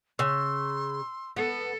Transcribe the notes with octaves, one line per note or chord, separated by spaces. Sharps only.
C#3 C6 E6
B3 A4